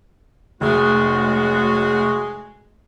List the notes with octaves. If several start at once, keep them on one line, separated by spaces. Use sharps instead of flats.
F1 F#3 G#3 A3 F#4